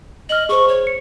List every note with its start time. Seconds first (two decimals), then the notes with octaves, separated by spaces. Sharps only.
0.29 D#5 F6 F#7
0.49 G#4 C5 C#6
0.68 C#5
0.87 C#7